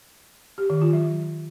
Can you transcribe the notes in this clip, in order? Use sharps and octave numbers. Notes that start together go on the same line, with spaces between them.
G4
D#3
F4
F#3